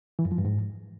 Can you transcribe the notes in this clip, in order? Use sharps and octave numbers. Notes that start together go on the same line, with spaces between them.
E3
F#2
F3
G2
G#2